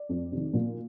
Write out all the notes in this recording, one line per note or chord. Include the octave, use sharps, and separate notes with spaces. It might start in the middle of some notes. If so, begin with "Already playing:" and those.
Already playing: D5
F2
C3 D#3
A#2